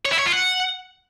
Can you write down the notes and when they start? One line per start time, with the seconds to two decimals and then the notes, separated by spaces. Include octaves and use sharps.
0.05 C#5
0.12 E4
0.19 C#5
0.26 F4
0.33 F#5